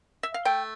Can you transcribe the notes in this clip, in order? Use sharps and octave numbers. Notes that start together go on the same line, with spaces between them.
E5
F5
A3 G5